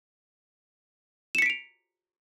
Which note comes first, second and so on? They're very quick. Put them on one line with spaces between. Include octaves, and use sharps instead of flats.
E7 C#7 B6 D7 F7